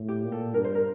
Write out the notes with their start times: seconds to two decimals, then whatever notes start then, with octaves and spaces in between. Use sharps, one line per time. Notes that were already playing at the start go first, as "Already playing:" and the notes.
Already playing: A2
0.08 G4
0.24 A#2
0.32 A4
0.54 G2 A#4
0.64 C5
0.75 A#4